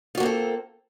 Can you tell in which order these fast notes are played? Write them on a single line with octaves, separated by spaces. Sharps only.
F4 F#4 A#3 C4 A4